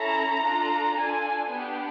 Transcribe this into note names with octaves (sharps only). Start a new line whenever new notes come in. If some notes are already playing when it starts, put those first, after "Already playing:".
Already playing: C#4 E4 A4 A#5
D4 F4 A4
D4 F4 A4 G#5
B3 D4 G4